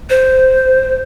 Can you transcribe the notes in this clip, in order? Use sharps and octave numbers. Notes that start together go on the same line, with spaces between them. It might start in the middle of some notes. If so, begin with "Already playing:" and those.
C5